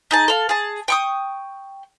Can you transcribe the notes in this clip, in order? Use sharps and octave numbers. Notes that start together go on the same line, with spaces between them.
D#4 G#4 A5
A4 F5
G#4 A5
G5 C#6 D#6